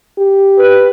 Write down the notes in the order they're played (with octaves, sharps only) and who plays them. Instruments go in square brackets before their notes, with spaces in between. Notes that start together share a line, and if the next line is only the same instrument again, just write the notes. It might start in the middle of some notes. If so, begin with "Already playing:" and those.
[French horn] G4
[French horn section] B4